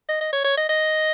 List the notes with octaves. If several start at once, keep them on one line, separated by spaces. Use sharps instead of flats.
D#5
D#5
C#5
C#5
D#5
D#5